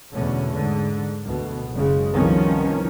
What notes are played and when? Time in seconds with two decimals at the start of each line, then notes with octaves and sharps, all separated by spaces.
0.12 E2 B2 D3 A3 C#4
0.53 G#2 D3
1.26 D2 B2
1.72 F#1 C#3 G#3
2.15 C2 D#3 F3 B3 C#4